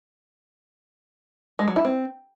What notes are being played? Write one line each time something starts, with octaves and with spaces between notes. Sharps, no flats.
G#3
F#3
E4
C4